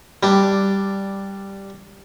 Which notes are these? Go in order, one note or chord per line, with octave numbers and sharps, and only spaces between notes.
G3 D4